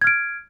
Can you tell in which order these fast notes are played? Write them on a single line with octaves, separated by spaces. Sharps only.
G#6 F6 D7